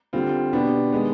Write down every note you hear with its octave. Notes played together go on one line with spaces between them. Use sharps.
D3 G3 C4 F4
B2 B3 D4 G4
D#3 G#3 B3